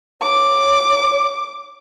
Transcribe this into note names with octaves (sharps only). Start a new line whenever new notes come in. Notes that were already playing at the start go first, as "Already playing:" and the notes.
C#5 D6